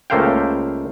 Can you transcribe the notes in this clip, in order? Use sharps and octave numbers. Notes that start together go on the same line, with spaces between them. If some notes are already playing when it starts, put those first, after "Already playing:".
C#2 A3 A#3 C5 F5 G5